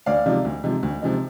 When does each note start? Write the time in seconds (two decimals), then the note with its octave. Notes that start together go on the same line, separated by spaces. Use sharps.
0.06 D2 D5 F5
0.26 C3 F3 G#3 D#4
0.45 D2
0.64 C3 F3 G#3 D#4
0.83 D2
1.02 C3 F3 G#3 D#4